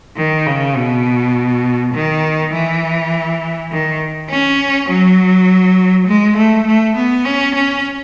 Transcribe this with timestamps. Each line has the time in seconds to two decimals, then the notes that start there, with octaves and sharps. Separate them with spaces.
0.17 D#3
0.46 C#3
0.76 B2
1.94 D#3
2.53 E3
3.71 D#3
4.30 C#4
4.89 F#3
6.07 G#3
6.37 A3
6.67 A3
6.96 B3
7.25 C#4
7.55 C#4